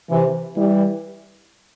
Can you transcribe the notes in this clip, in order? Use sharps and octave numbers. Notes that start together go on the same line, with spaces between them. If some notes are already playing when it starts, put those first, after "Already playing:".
C3 E3
E3 G3